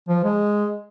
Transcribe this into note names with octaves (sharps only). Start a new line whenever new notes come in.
F3
G#3